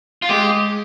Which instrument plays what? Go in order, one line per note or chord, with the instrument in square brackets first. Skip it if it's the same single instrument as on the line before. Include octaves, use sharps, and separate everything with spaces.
[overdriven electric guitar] F4
[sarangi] G#3 [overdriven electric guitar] G4